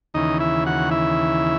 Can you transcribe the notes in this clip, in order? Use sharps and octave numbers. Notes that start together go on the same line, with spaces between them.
D#2 C#3 E3 D#4 D#5
E4 E5
F#4 F#5
E4 E5